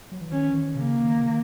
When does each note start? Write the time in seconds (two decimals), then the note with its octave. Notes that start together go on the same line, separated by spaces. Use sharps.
0.12 F#3
0.21 E3
0.32 D#3 C#4
0.49 E3
0.56 D#3
0.75 B2
0.79 C#3 A#3
1.03 D#3
1.20 C#3
1.26 D#3